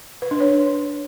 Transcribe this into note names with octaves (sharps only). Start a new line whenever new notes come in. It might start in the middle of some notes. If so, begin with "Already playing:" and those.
B4
D4
C#5